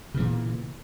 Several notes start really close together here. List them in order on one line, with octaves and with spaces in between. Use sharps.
C#3 E3 A#2